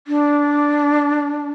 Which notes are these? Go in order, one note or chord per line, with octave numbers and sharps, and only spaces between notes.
D4